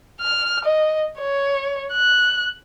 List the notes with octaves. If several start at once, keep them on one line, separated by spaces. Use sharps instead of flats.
F6
D#5
C#5
F#6